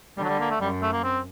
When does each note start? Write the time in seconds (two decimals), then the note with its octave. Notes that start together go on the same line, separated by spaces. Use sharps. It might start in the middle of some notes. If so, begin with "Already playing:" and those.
0.18 D3 G3
0.24 F#3
0.29 G3
0.40 A#3
0.51 A3
0.61 F#2 G3
0.82 A3
0.93 A#3
1.04 C4